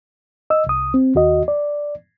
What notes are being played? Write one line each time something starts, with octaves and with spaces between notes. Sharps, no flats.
D#5 E6
C2 D#6
C4
D#2 F#4 D#5
D5